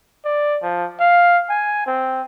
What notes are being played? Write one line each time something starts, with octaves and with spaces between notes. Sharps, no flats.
D5
F3
F5
G#5
C4